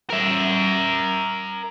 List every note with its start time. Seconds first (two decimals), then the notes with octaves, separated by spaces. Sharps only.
0.10 A#4 E5